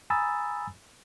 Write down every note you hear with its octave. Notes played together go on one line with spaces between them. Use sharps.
G#5 A#5 B5 D#6 E6 A6